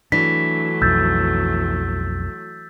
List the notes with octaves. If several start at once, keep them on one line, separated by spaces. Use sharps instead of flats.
E3 F#3 A3 D4 B6
B1 F2 E6 G6 A6